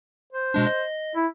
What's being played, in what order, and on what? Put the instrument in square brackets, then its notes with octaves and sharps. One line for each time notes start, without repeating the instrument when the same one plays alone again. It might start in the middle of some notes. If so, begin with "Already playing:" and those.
[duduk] C5
[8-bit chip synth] B2 G#3 D4
D#5
[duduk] E4